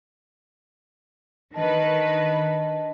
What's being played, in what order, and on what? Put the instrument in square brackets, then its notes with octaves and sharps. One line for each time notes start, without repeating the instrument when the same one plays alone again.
[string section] D#3 B4 [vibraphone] D4 D#5 A5